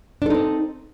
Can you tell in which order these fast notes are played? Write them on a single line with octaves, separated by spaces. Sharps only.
D4 A4 D#4 C4